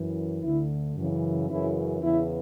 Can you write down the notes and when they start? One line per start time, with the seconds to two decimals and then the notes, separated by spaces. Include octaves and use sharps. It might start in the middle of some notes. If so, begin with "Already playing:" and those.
Already playing: F#2 E3
0.43 D2 D3 E4
0.97 F#2 C#3 E3
1.50 F#2 C#3 E3 E4
2.02 E2 C#3 E3 E4